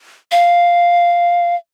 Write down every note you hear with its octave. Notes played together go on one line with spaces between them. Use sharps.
F5